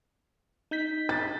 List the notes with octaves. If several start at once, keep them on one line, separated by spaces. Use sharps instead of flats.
D#4 G6 B6
A6